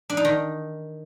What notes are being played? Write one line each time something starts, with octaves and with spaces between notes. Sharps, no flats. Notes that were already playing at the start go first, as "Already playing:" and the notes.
D4
D#4
D#3